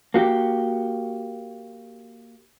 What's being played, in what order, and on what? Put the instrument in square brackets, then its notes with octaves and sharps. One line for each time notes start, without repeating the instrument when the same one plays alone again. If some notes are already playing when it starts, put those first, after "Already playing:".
[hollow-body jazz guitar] A#3 F#4 G4